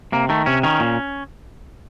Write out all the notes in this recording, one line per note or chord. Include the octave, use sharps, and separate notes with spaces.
C3 A#3
D#3 A3
C3 C#4
D#3 C#4
A#2